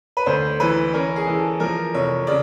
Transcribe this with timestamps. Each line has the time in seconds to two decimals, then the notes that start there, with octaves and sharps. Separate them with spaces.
0.17 B4
0.26 D2 C5
0.60 E3 B4
0.94 C#4 A#4
1.16 G#4
1.27 E3
1.38 A4
1.60 F3 A#4
1.94 F1 C#5
2.27 C#3 D5